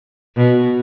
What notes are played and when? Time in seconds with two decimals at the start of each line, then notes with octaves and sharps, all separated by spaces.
0.37 B2